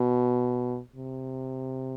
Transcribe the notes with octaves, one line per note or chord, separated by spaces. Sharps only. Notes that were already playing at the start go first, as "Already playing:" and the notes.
Already playing: B2
C3